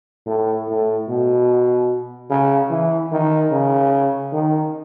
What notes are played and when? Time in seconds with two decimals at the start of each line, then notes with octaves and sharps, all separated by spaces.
0.27 A2
0.68 A2
1.09 B2
2.30 C#3
2.71 E3
3.12 D#3
3.52 C#3
4.33 D#3